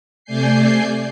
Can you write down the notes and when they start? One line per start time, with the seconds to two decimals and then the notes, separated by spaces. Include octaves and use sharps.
0.24 C3 A3 D5 G#5 G6 C7